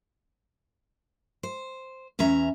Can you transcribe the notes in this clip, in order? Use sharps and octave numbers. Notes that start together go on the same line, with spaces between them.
C5
E2 C#4 E5 A#5